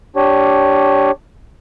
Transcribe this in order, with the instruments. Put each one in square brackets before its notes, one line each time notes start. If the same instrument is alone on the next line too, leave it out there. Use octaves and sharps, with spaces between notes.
[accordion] D4 G4 C#5